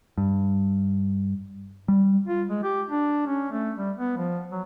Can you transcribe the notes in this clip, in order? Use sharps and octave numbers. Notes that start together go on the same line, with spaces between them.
G2
G3
F4
G#3
G4
D4
C#4
A3
G3
B3
F3
F#3